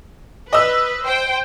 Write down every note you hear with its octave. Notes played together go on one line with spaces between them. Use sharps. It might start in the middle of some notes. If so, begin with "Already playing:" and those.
B4 D#5 E6
C5 G5